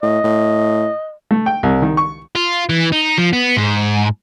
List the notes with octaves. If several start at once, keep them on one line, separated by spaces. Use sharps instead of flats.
A2 D#5
A2
A3
G5
C2
D#3
C#6
F4
E3
D#4
F3
B3
G#2